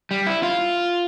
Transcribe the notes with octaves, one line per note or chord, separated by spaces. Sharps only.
G3
E4
F4